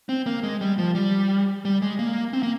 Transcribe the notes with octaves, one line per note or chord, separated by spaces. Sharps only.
C4
A#3
G#3
G3
F3
G3
G3
G#3
A#3
C4
A#3